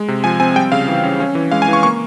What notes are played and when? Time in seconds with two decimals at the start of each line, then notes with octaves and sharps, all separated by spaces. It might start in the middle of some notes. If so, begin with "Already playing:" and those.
Already playing: G#3
0.08 C3
0.24 F3 G#5
0.40 C4 G#5
0.56 G3 G5
0.72 C#3 F5
0.88 E3
1.04 C#4
1.20 C#4
1.35 E3
1.51 G#3 F5
1.62 G#5
1.68 E3 C#6
1.83 A#3 C#6